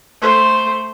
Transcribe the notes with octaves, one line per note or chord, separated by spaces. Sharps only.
A3 C5